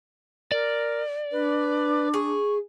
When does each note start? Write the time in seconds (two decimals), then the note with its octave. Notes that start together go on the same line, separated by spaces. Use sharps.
0.52 A#4 D5
1.32 D4 B4
2.14 G#4 C#6